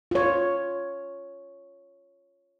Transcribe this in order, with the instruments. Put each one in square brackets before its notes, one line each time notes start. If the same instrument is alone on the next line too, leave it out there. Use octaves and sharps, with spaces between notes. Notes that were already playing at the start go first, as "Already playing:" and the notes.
[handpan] F4 C#5